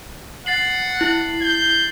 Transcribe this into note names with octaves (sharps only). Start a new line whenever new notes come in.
F#5 A6 C7 F#7
E4
G6